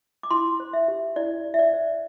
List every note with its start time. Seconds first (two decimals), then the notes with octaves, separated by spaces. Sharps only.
0.23 D6
0.31 E4 C6
0.60 C5
0.73 E5
0.88 G4
1.16 E4 D5
1.44 E4
1.54 E5
1.59 D5
1.73 C5